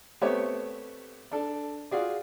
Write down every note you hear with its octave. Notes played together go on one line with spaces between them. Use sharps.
A3 B3 C4 G4 C#5
D4 A4
F4 F#4 G#4 D5